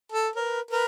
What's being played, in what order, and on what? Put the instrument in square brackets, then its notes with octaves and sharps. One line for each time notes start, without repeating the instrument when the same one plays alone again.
[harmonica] A4
[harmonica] A#4 [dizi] C#5
[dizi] B4
[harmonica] A#4 [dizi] B4